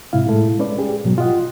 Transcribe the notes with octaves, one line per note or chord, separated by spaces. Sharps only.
G#2 C3 E4 F5
A2 G#3 A3 E4 A4
G#3 C#4 B4 D5
G4 G#4
G#2 B2 F#3
F4 G4 D#5 F#5